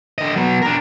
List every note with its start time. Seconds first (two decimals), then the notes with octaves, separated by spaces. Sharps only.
0.18 D3 D#5
0.36 F#3 B3
0.62 D4 A#4